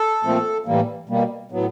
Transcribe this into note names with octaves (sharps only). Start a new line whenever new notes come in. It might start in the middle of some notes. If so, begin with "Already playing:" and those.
Already playing: A4
A#2 F3 A3 C4
A2 E3 G3 A#3
B2 G3 A#3
A2 F#3 B3